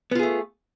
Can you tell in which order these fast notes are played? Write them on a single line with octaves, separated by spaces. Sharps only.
B3 F4 G#4 A3